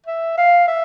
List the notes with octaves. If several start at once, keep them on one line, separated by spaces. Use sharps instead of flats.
E5
F5
E5